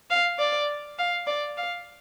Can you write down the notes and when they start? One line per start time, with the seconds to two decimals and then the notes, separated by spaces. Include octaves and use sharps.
0.10 F5
0.39 D5
0.98 F5
1.27 D5
1.57 F5